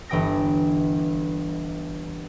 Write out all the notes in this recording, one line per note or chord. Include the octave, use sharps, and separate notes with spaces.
G1 D3 E3 G5 D#6 A#6